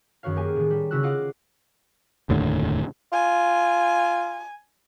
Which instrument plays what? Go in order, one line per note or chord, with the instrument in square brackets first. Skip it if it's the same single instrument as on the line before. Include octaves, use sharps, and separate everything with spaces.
[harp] F#2 D#3 F#4 C#5 F5
A#3 G4 G#4 G#5
A2 D#3
G3
C#3 C#4 E4 F#4 E6 F#6
F4 D#5 F5 F#5 D6
[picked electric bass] F1 D#2 A2 D3
[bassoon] F4 [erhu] G#5